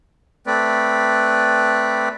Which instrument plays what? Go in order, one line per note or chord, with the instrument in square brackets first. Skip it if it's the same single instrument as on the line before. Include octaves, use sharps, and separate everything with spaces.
[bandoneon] A3 C4 B4 D5